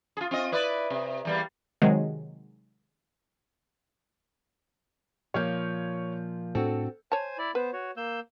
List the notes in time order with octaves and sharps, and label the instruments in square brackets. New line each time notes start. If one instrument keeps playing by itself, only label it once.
[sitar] F4 G#4
C4 F4 D#5
E4 B4 D5
C3
E2 G3 A#3
[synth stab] C3 D#3 F#3 G#3
[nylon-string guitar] A#2 F3 A#3 [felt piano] C#5 F6 G6
[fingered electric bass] A2 D4 [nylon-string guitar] C4 F#4 [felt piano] A4
[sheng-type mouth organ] C5 G#5 [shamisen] C#5 A5
[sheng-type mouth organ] E4 D5
[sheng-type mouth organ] B3 C5 [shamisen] B4
[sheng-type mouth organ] F#4 C#5
A#3 E6 G6